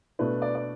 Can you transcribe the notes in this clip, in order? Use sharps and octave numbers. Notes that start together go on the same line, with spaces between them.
B2 A3 D4 B4
D5
D5